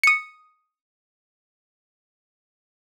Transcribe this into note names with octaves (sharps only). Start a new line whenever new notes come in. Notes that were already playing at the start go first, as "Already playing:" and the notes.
D#6 C#7